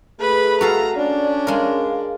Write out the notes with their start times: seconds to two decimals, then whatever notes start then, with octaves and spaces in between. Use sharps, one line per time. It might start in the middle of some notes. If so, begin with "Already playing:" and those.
0.20 A3 G#4 B4 B5
0.61 F#4 A4 F5 A#5
0.96 C#4 D4 D5
1.47 G#3 A#4 F5